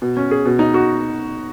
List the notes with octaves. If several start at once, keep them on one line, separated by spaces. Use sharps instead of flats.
B2
C#4
G#4
B2
D#4
F#4